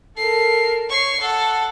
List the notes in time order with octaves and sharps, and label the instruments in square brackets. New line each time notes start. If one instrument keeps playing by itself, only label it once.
[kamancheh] A4 A#4 [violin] C7
[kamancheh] C#5 [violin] C#6 C7
[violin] A4 [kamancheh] F#5 A5